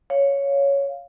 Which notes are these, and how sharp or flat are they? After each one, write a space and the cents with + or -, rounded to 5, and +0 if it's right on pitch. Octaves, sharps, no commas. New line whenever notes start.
C#5 +5 F5 +0